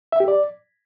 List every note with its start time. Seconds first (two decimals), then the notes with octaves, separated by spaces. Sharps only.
0.12 E5
0.20 G4
0.28 D5